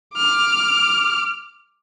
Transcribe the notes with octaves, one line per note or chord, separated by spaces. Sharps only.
D6 F6